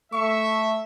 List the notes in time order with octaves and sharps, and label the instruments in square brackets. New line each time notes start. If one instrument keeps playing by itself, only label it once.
[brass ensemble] A3 E5 [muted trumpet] C#6